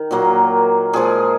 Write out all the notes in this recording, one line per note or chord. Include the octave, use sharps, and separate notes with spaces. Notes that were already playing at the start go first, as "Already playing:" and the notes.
Already playing: D#3
A#2 F#3 A#3
A#2 F3 G#3 G#4